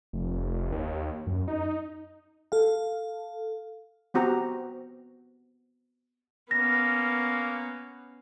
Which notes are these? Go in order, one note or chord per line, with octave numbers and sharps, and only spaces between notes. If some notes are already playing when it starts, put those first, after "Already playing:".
F1
D#2
F#2
D#4
A4 F5
B3 C4 F#4 G4 A#5
A#3 B3 C#4 A#6